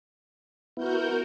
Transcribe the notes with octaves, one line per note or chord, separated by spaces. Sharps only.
B3 E4 F#4 A#4 G6